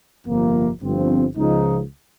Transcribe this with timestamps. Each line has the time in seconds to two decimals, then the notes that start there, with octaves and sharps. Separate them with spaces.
0.26 G1 F2 C3 F3 A#3
0.81 G1 G2 F3 C4
1.36 C#2 C#3 F3 G#3 D#4